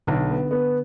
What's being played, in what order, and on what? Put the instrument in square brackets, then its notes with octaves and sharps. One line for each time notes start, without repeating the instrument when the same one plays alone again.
[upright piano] B1 [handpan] D3
[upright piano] B3
B3